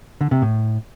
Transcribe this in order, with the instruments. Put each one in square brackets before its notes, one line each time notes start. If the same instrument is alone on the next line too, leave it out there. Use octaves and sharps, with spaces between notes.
[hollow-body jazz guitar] D3
C3
A2